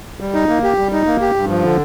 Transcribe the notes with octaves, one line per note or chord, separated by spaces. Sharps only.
G3
D#4
A#3
G4
G3
D#4
A#3
G4
G2
F3
D3